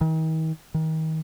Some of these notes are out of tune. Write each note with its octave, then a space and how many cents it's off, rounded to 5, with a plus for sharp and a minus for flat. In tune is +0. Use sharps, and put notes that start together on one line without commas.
D#3 +40
D#3 +35